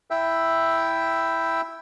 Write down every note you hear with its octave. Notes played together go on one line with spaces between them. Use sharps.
E4 E5 G5